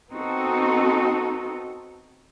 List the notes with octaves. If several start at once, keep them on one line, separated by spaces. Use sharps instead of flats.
B3 C4 D#4 F#4 A4